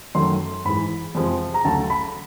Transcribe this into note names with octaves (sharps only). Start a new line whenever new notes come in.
F#2 D#3 F#3 A3 C6
G#2 E3 G#3 B5
F2 C3 F3 G#3
A#5
D2 C#3 F#3 A3 A5
B5